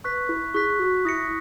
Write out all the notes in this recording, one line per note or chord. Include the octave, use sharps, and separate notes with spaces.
B4 C#6 F#6 B6
E4
G#4 C#6 F#6 B6
F#4
E4 D#6 A#6 C#7